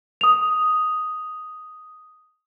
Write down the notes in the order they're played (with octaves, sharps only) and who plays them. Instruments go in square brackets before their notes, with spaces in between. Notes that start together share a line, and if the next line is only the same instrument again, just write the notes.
[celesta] D#6 F7